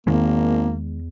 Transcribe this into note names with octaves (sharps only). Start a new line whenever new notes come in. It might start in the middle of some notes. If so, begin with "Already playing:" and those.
G#1 E2 D#3 G#3 A#3